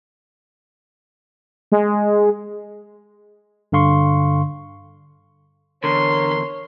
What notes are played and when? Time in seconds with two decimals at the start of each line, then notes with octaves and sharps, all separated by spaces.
1.72 G#3
3.72 G2 D3 F5 C6 C#6
5.84 E2 D3 A#4 C#5 C6